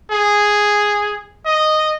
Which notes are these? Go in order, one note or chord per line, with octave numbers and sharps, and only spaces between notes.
G#4
D#5